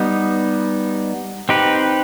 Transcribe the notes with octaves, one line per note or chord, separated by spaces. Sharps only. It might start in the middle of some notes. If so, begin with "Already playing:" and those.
Already playing: G3 B3 D#4
C4 D#4 G4 B4